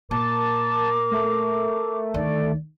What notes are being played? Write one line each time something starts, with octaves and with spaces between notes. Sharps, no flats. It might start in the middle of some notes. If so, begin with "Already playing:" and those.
A#2 A#4 A5 D6
A3
D2 D#3 D5